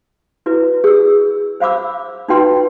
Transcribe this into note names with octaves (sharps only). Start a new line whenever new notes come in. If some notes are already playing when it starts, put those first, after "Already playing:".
E4 F#4 B4
G#4 E6
C5 F5 B5 D6 E6
D#4 F4 F#4 B4 G5 C6